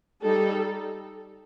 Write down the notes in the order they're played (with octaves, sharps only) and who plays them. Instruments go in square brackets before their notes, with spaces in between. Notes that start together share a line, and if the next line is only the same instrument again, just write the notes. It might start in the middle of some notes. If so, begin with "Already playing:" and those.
[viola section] G3 D#4 A4